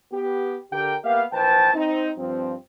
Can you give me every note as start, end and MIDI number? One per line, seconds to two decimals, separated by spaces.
0.13 0.57 59
0.13 0.57 67
0.72 0.95 50
0.72 0.95 67
0.72 0.95 70
0.72 0.95 79
1.04 1.24 58
1.04 1.24 59
1.04 1.24 67
1.04 1.24 76
1.04 1.24 77
1.33 1.73 34
1.33 1.73 52
1.33 1.73 71
1.33 1.73 72
1.33 1.73 79
1.33 1.73 81
1.74 2.11 60
1.74 2.11 63
2.18 2.54 43
2.18 2.54 53
2.18 2.54 60